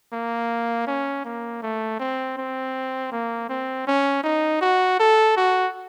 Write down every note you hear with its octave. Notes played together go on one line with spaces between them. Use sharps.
A#3
C#4
A#3
A3
C4
C4
A#3
C4
C#4
D#4
F#4
A4
F#4